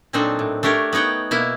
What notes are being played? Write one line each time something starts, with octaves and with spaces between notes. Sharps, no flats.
A#2 F#3 C4 D4 D#4 A4
A2
A3 D4 G4 A#4 C#5
B3 D#4 C#5 F#5 G5
B2 A#3 E4